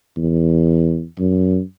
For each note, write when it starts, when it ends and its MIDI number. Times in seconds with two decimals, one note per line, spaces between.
0.17 1.04 40
1.19 1.60 42